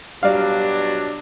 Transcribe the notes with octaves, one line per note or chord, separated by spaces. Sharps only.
B2 F#3 G3 D4 D5 F5